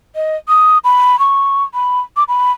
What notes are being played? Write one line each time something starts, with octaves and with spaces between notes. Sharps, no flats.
D#5
D#6
B5
C#6
B5
D6
B5